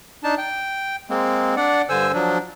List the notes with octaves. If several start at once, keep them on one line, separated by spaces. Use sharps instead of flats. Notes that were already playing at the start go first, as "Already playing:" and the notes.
D4 D#4 A5
G5
G#3 A#3 C4
D4 D5 F#5
G2 D3 C5 G#5 E6
F3 F#3 D4